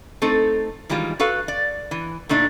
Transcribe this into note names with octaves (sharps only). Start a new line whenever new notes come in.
A3 C4 D#4 A4
D#3 E3 G3 G#3 F4
F#4 A4 B4 F5
D5
E3
A#2 A3 D4 D#4